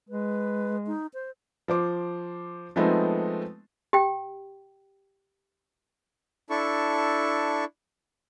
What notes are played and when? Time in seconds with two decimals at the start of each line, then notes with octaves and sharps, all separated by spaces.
0.09 G#3 B4
0.87 D#4
1.14 C5
1.68 F3 C5 D6
2.76 F3 G#3 A3 B3 C4 D#4
3.93 G4 G5
6.50 D4 E4 A4 C#6